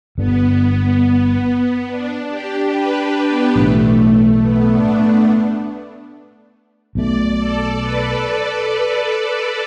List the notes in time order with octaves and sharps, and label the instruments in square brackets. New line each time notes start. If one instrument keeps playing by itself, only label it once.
[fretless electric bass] G1 G2 D3 [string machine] B3
[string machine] D4
G4
B4
D4
B3
[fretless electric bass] B1 A2 E3 [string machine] A3
[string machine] A3
A3
B3
D4
A3
[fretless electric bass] B1 B2 A3 [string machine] D5
[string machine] A4
B4